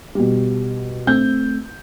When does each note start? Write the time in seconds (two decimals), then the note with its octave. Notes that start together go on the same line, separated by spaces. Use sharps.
0.15 B2 G3
1.07 A3 C4 G6